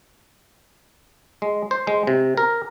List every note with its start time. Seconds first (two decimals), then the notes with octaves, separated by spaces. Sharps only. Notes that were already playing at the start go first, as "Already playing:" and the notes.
1.42 G#3
1.71 C5
1.87 G#3
2.07 C3
2.37 A#4